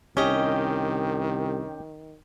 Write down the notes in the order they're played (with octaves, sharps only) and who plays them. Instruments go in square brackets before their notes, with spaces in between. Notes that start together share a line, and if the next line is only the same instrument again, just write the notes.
[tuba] C2 [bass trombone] D#3 [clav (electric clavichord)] C#4 [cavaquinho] G4 D#5